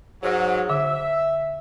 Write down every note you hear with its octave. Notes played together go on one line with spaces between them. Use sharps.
G#2 F#3
D3 E5